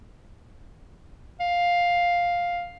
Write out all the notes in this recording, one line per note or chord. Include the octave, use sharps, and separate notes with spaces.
F5